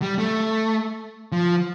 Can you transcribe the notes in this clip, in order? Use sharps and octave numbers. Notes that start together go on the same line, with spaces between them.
G3
A3
F3